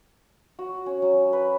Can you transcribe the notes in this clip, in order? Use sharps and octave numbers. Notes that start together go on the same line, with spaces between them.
F#4
C#4
F#3
B4